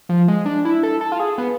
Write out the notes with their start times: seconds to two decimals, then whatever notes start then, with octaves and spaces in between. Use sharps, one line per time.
0.09 F3
0.28 G#3
0.46 D4
0.65 E4
0.83 A4
1.01 A4
1.12 F4
1.20 G#4
1.38 B3